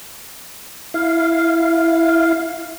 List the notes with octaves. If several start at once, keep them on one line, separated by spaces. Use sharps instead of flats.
E4 F5